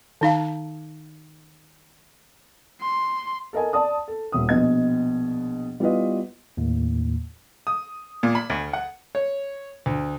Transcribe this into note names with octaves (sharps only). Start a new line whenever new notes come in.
D#3 D#4 F5 A5
C6
A4 A#4 D#5 G#5
D5 A5 D#6
A4
D#1 E5 D#6
A#1 B2 B3 D#5 G#6
G3 B3 E4 F4 B4 D#5
D#2 A2
D#6
A#2
B5
D2
F#5
C#5
D2